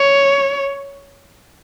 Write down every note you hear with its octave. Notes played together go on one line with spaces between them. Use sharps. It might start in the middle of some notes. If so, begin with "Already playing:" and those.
Already playing: C#5